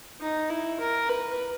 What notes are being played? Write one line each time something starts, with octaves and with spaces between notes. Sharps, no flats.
D#4
E4
A#4
B4